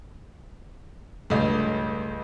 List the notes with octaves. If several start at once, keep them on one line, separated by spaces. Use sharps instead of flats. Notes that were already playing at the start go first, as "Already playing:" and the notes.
C#2 G2 A3 F5